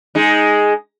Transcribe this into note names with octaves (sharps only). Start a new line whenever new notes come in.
G#3 D#4